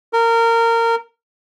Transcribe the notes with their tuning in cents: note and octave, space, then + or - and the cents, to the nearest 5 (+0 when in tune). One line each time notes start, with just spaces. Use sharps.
A#4 -20